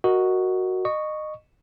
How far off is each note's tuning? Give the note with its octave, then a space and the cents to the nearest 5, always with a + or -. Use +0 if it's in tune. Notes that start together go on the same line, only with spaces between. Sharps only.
F#4 +0 A#4 +0 D#5 +0
D#5 -25 C#6 +0